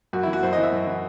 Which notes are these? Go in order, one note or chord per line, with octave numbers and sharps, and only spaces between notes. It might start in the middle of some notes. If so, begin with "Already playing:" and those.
F#2 F#4
E4
E3
F#4
F#2 C5
D#5
E3
E5
F#2
E3